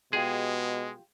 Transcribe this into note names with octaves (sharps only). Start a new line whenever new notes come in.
B2 G#3 F4 G4 G#4 F5